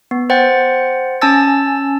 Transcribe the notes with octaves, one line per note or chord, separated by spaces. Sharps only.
B3
C5 F#5 G5 A6
C#4 G#5 A5 E6 A6